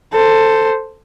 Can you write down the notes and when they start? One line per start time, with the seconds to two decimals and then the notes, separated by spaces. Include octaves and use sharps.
0.13 A4 C5